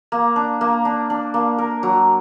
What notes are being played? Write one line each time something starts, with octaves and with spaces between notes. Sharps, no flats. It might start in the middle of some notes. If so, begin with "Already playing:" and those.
A#3
D4
A#3
D4
D4
A#3
A#4
F#3